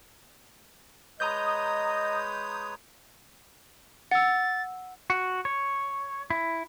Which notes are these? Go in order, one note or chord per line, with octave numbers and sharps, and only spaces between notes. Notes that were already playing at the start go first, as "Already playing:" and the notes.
G#3 B4 C#5 D#5 A#5 D#6 G6
F#5 E6 A6
F#4
C#5
E4